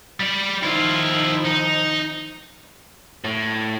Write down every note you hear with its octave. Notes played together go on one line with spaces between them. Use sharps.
G3 D5
D#3 F3 E4 F4
D#4
A2